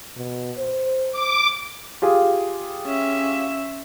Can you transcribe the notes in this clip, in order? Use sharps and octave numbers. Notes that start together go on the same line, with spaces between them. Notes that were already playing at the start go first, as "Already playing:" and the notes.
B2
C5
D6
F4 G4 G#4
C#4 E5